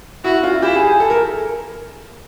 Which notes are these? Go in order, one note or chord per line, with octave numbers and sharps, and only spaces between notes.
E4 F#4
F4
E4 G4
G#4
G#4
A4
A#4